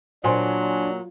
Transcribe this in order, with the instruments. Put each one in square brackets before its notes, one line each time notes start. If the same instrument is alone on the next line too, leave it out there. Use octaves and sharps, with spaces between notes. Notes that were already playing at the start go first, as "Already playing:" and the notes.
[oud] A#2 [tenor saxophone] F#3 [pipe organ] D4 [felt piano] C5 G#5 C6